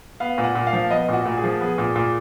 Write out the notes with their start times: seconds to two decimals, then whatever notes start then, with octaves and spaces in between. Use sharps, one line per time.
0.20 B3 F5
0.38 A#2
0.44 F#5
0.55 A#2
0.67 F5
0.73 F3
0.90 B3 D#5
1.09 A#2 F#4
1.26 A#2
1.37 G#4
1.43 F3
1.60 B3 G#4
1.78 A#2
1.96 A#2